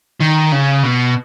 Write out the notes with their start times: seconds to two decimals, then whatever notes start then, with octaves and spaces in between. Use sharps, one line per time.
0.20 D#3
0.52 C#3
0.83 B2